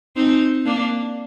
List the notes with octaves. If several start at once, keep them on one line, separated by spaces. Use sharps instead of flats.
C4 D#4
A#3 D4